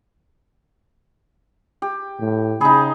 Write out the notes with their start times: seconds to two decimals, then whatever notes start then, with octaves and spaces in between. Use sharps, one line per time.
1.82 G4
2.20 A2
2.61 C#3 D#4 G#4 B5